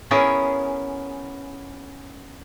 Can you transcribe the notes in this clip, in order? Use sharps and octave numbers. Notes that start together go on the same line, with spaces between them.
B3 C#4 E4 G#4 A#4